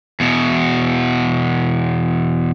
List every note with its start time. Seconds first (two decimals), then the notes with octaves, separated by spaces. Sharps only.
0.20 E2 B2